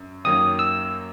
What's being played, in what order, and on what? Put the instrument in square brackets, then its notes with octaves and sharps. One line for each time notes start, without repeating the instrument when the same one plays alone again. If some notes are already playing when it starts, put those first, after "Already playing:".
Already playing: [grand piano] F#2
[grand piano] F#2 D#3 F#3 A#3 [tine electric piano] D#6
[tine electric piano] E6